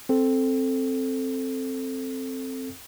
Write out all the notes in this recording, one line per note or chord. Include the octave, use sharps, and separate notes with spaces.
C4 A4